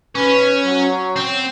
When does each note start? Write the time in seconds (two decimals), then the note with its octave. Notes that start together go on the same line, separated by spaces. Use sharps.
0.15 B1 C#4 B4
0.65 F#3
1.16 C4